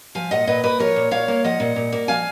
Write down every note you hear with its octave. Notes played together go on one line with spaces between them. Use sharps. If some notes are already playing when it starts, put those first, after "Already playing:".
F3 F5 G#5
A#2 D#5 F#5
A#2 B4 D#5
A#3 B4 D#5
F3 A#4 C#5
A#2
A#2 C#5 F5
A#3
F3 D#5 F#5
A#2
A#2
A#3
F3 F5 G#5